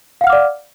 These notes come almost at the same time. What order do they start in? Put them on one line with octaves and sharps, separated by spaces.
F5 F#5 F6 D6 D5